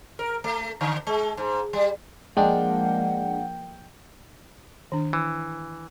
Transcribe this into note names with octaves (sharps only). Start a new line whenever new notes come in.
A#4
A3
D3
G#3
G#2
G3
F3 G#3 A#3 D4 F#5 G5
D#3 D4
E3